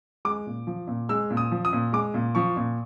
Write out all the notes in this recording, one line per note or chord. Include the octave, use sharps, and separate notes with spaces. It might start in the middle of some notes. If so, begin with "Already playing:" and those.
G#3 D6
A#2
F3
A#2
G#3 E6
A#2
D#6
F3
D#6
A#2
G#3 D6
A#2
F3 C#6
A#2